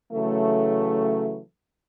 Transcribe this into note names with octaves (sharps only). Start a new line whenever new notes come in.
C#3 E3 F#3 A3